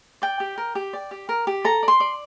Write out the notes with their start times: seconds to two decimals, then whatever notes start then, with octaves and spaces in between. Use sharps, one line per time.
0.22 D5 G5
0.40 G4
0.58 A#4
0.75 G4
0.93 D5
1.11 G4
1.29 A#4
1.47 G4
1.65 A4 A#5
1.83 D5
1.88 C6
2.00 D5